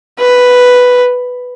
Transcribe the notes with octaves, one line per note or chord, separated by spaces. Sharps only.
B4